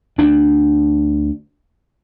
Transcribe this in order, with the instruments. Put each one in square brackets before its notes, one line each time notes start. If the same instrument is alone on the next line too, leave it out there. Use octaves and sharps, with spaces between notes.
[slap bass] D2 D4